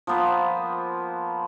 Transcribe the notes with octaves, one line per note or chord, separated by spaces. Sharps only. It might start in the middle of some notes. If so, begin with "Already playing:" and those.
F3 A#3 B3 C5